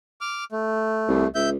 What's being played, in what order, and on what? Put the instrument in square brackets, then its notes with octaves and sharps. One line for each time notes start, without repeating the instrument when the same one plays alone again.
[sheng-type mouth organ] D6 F6
A3
[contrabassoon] C2
[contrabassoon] C#2 [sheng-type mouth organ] E5 G6